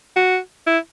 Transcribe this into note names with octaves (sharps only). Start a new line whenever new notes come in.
F#4
E4